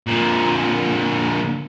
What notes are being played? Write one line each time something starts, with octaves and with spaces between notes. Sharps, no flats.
A#2 D3